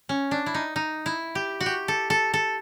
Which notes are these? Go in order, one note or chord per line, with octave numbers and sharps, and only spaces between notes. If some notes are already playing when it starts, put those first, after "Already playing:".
C#4
D4
E4
D#4
D#4
E4
G4
F#4
G4
A4
A4
A4